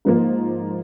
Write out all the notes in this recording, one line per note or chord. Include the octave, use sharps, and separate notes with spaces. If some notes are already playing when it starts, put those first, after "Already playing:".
G#2 F3 A#3